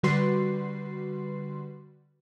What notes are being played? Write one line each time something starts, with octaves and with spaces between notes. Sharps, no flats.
D3 G3 F#4 B4 C6 C7